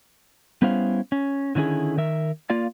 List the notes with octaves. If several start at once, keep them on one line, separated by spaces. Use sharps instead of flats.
G3 B3 C#4 E4 C5 F5
C#4
D3 D#3 C#4 E4 G#4
D#3 A#4 E5
A#3 F4 D5 F5